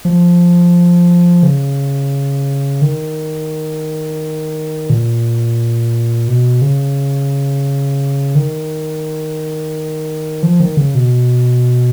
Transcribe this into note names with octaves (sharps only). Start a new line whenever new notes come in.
F3
C#3
D#3
A#2
B2
C#3
D#3
F3
D#3
C#3
B2